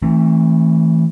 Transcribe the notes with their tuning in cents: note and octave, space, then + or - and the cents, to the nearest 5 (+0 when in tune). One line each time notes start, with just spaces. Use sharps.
E3 -10 A3 +15 C4 +45